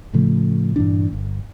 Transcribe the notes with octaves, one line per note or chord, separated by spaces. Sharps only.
A2 C#3 F3 A3
G2 A#2 E3 D4
G1